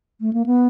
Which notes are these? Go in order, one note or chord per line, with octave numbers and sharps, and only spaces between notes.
A3
A#3
B3